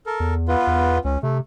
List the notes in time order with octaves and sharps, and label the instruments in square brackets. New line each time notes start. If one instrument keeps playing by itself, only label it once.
[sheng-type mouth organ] A4 A#4
[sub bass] E2
[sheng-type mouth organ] B3 F4 B4
[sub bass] E2
[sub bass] C#2 [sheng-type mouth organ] C#4
[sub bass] C3 [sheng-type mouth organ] A3